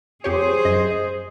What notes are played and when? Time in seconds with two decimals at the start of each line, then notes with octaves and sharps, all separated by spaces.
0.24 F2 G4 G#4 C5 C#5
0.65 F#2 D#5